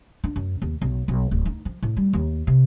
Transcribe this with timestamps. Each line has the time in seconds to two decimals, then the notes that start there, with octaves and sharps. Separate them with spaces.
0.24 D4
0.36 F#2
0.62 D#2
0.82 B1
1.08 B1
1.31 D1
1.46 D#4
1.65 F3
1.83 A2
1.97 G3
2.13 D#2
2.47 C3